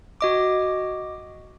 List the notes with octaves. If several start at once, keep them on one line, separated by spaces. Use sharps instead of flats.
F#4 D#5 D6